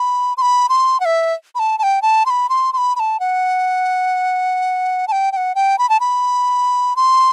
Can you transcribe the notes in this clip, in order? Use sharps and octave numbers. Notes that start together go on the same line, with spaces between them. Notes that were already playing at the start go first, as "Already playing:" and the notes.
Already playing: B5
C6
B5
C6
F#5
E5
B5
A5
A5
G5
A5
C6
B5
C6
C6
B5
B5
A5
F#5
A5
G5
G5
F#5
G5
B5
A5
B5
C6